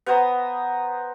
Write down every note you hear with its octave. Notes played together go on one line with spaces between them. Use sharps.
B3 B4 C5 A#5